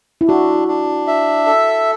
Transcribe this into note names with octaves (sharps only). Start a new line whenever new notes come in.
E4
D4 F#4
D4
E5
A4